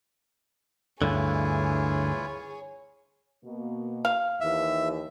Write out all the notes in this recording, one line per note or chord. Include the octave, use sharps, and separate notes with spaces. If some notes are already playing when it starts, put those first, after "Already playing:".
D2 G2 D3 E3 E4 F4 G#4 C#5
B2 A#3
F5
D#2 E3 E5